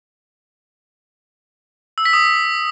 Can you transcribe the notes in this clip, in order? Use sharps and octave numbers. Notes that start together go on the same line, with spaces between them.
E6
B6
D#6